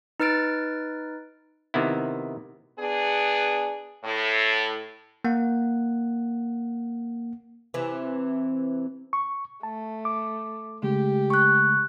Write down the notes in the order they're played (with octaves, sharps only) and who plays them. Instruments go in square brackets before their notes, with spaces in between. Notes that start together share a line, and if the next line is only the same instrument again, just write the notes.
[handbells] D#4 B4 F6 A6 D7
[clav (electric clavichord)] C3 D#3 B3 E4
[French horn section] B3 D4 G#4
A2
[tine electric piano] A#3 F#5
[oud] C3 E3
[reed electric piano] C#6
[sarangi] A3 [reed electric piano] A5
[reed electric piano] D6
[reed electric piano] C#3 G#3 A3 [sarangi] G4
[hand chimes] C#6 F#6